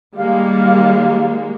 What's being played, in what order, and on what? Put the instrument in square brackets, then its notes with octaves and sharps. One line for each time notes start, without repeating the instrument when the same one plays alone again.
[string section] D#3 G#3 A#3 [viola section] G3 [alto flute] F5